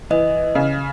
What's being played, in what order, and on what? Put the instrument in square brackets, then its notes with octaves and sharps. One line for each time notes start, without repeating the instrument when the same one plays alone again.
[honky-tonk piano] E3 [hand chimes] D#5
[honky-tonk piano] C#3